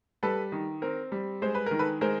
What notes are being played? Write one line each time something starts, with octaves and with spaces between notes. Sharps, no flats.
G3 A4 B4
D#3
C4 A#4
G3
G#3 C5
B4
D#3 A#4
A4 B4
G#3 A#4 C5